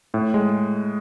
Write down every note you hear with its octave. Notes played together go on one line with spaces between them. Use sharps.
A2
G#3